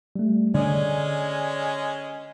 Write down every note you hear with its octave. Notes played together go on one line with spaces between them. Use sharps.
G3 A3
D3 G#3 C#4 D5 D#5